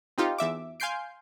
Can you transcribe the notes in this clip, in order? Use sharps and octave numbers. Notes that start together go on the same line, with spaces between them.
C4 D#4 F4 G4
E2 E5 D6
F5 G#5 C6 G6 C7 D7